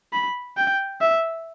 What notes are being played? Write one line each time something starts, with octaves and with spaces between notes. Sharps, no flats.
B5
G5
E5